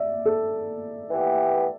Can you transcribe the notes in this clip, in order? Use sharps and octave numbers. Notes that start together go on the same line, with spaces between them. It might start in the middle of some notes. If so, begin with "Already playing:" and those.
Already playing: D5 E5
A4
E3 B3 G4